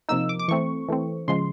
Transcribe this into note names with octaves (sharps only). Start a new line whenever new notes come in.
C3 F3 A#3 D#4 E6
D6
D6
E3 A3 C4 C#6
E3 A3 C4
C#3 F3 G#3 C6